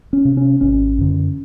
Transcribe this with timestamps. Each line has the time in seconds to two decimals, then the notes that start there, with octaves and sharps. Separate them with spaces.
0.13 C#4
0.25 C3
0.37 C#4
0.61 G#1 C#4
0.98 F#2 D3